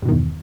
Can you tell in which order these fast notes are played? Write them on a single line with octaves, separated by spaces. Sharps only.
G2 B2 D#3 E2